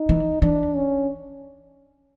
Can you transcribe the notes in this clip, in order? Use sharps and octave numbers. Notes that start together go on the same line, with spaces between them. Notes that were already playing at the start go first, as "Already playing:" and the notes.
Already playing: D#4
E3
E3 D4
C#4